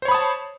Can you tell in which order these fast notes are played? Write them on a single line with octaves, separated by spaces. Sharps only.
C5 C#5 B5 D#6 A5